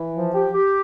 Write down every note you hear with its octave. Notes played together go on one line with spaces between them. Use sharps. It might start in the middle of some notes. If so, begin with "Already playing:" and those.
Already playing: E3
F3
G4
G4